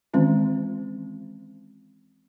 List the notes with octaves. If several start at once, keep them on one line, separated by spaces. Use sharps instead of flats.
D#3 E3 G#3 C4 C#4 F4